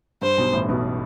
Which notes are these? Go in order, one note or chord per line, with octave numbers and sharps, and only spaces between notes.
G2 C5
B1 B2
A1 A2
B1 B2